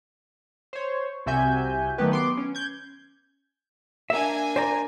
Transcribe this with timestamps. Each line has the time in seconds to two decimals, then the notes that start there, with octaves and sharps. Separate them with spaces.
0.73 C5 C#5
1.26 C2 C3 F#4 E5 G#5 G6
1.98 D#3 F#3 A3 B3 G4 B4
2.11 B3 C6 D6
2.37 C#4
2.55 G6 G#6
4.10 A#3 D4 E5 G#5
4.56 C5 D5 A#5